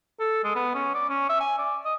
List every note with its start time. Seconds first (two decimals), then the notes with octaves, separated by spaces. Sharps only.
0.20 A4
0.44 G#3
0.56 B3
0.75 C#4
0.95 D5
1.10 C#4
1.29 E5
1.41 G#5
1.58 D5
1.85 D#5